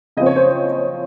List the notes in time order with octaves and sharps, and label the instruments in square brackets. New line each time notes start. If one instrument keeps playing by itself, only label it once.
[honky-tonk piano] C#3 F3 C4 D#5
C#5
C5
C#5